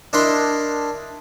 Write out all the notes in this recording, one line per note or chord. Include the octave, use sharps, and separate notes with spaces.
D4 E4 A#4 D#5 C6